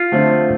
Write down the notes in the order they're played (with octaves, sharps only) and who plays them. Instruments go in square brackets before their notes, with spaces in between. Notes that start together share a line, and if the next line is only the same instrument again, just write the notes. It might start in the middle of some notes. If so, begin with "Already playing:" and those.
Already playing: [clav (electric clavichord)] F4
[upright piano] D3 F3 A3 C4